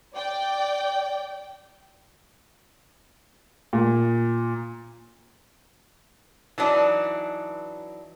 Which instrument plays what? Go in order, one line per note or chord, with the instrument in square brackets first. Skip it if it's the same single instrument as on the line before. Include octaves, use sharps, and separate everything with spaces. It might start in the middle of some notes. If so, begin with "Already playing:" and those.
[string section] D5 G5
[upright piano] A#2
[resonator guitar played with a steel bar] E3 F#3 D4 D#4